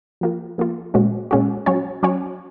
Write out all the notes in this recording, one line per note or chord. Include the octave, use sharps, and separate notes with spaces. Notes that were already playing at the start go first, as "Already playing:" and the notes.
F3 A#3 F4
F3 A#3 F4
A#2 G#3 C#4 F#4
A#2 G#3 C#4 F#4
F#3 C#4 F#4 C#5
F#3 C#4 F#4 C#5